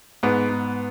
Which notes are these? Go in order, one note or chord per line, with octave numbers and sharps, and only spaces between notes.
G#2 B3
G#2